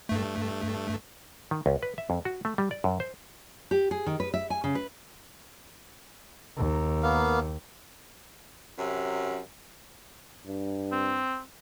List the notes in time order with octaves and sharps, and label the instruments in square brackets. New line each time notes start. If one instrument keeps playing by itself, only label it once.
[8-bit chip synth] G2 A3
[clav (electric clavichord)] D#3
C#2
B4
E5
F2
F#4
A3
G3
D5
F#2
C5
[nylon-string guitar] G4
G#4
D#3
B4
E5
G#5
C#3
B4
[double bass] D#2
[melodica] A#3 B3 F5
[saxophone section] F#2 C3 F#3
[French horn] G2
[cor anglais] C4